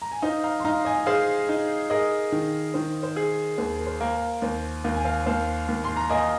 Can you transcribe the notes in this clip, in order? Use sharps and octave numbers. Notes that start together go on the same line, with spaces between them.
A#5
G#5
D#4 C5 F5
F5 A#5
C6
D#4 F5 A#5
D#5 G#5
G#4 C5 F5
D#4
G#4 A#4 D#5
D#3
D#3 C5
C5
G#4
D#2 C5
A#4
C5
A#3
A#4
D#2 C5
D#2 F5
G#5
C5 F5
D#2 C5 F5
D#2
C6
A#5
A#3 D#5 G#5